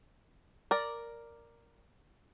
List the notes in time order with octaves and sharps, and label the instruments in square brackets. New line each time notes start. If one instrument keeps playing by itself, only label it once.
[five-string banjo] A#4 D5